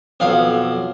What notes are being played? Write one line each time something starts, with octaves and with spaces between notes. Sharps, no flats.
B1 F2 F5